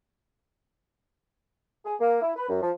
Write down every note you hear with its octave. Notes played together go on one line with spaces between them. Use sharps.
G#4
A#3
E4
B4
F#2
F3